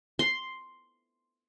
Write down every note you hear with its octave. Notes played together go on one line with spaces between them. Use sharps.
C6